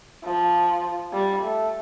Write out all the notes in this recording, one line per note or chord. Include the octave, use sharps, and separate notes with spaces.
F3
G3
A3